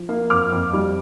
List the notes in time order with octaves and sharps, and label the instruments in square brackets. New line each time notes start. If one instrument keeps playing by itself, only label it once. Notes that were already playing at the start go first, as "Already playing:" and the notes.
Already playing: [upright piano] F3
A#3
F2 D6 F6
F2
G3